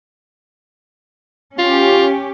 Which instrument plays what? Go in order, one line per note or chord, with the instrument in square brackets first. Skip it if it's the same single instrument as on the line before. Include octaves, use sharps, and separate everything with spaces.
[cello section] C#4 G4 [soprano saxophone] F4